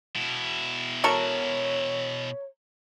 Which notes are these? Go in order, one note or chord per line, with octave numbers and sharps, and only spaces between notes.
B2 E4
F#4 A4 A#4 C#5